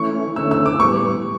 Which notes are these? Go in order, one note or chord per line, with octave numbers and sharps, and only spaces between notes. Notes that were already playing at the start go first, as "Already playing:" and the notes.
Already playing: E3 A3 C#4 E4 C#6
D3 A3 C#4 E4 E6
E6
D6
A2 E3 G3 B3 C#6